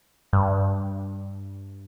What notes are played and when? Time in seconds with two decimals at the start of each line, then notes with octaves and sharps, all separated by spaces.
0.33 G2